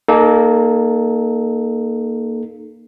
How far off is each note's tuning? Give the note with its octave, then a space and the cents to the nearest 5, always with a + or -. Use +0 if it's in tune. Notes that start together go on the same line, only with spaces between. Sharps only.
A#3 +0 D#4 -20 A4 -35